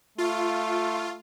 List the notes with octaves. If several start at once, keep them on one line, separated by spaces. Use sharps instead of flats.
A3 F4